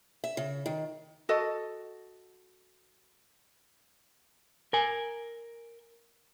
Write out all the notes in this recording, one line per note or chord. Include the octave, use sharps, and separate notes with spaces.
E5
C#3
D#3
F#4 A4 D#5
A#4 G#5